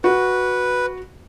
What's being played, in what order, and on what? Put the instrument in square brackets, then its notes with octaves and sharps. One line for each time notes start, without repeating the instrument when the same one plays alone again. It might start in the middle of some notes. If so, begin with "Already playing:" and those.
[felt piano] F#4 [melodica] B4